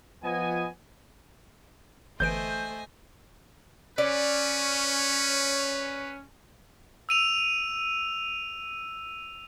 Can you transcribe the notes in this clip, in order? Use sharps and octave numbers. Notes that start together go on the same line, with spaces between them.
F3 B3 D#5 G#5
G1 E3 A3 C5 D#5 G#5 G6 D7
C#4 B4 D5
E6 D#7 F7